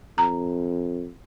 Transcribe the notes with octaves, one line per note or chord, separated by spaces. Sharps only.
F2 A#5